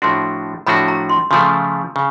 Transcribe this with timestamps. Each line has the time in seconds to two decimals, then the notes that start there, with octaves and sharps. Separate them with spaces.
0.02 A2 F3 A3 D4 F#4 C6
0.67 A2 F3 A3 D4 F#4 B5
0.88 A#5
1.09 C6
1.31 C#3 F3 A3 C6
1.96 C#3